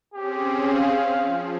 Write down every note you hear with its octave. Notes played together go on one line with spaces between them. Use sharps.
C4 C#4 G4 G#4
F5
F3